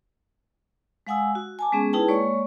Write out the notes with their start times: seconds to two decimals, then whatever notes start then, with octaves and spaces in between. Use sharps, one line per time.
1.07 G#3 F5 F#5 G#5 D#6 E6
1.35 F#4
1.59 G#5 A5 D6
1.72 G#3 B3 C#4 G#4
1.93 D#4 E4 G#4 B4 G5 A5
2.08 G#3 A#3 C#5 D5 C#6